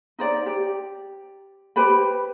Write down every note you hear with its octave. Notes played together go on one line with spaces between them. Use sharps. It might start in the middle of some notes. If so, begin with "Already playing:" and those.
D#4 C5 D5
G4
G4 B4 C5 B5